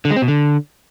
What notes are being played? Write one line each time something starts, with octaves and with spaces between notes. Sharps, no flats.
D3
G#3
C4
B2
D3